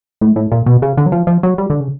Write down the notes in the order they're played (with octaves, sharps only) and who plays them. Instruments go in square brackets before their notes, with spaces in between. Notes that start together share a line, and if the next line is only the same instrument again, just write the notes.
[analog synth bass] A2
A2
A#2
B2
C#3
D3
F#3
F3
F3
F#3
G3
D3
C#3